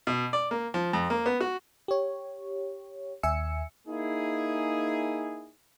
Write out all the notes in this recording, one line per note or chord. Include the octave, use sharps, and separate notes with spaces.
B2
D5
A#3
F3
F2
A#3
B3
F#4
G4 C#5
D#2 E5 G#5 E6 C#7
A#3 D#4 E4 G#4